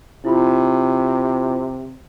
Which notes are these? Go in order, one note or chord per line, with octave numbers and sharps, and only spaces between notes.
C3 E4 F4 B5